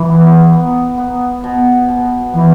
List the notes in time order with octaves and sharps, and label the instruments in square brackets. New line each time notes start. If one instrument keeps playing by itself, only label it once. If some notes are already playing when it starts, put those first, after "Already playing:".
Already playing: [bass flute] E3
[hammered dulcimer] B3
B3
B3
B2
B2
[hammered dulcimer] B2 [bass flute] E3